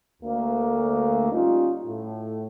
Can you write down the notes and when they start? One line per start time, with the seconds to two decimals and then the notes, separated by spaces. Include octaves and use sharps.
0.23 D2 A#3
1.32 G3 C#4 D#4 F4
1.86 A2